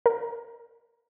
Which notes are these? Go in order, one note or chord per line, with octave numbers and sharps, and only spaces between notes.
A#4